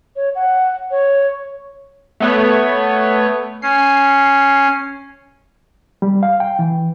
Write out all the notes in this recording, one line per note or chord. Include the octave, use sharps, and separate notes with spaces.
C#5
F#5
C#5
A3 B3 C#5
C#4 C7
G3
F5
G5
E3